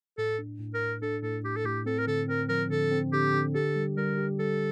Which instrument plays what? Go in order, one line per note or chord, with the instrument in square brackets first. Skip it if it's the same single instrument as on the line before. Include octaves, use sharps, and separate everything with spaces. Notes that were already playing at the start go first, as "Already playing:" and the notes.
[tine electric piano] A2 [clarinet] A4
[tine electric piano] D4
A2
[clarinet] A#4
[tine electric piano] A2
[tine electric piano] D4 [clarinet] A4
[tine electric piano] A2 [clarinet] A4
[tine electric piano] A2 [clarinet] G4
[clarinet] A4
[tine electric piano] A2 [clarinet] G4
[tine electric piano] C4 [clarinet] A4
[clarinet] A#4
[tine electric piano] D3 [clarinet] A4
[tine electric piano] C4 [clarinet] A#4
[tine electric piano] F3 [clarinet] A#4
[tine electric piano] D3 [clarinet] A4
[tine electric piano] C4
[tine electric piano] D3 [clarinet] G4
[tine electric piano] D3
[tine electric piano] G4 [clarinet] A4
[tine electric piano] G3
[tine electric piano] G3 [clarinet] A#4
[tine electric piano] G4
[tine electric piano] G3 [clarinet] A4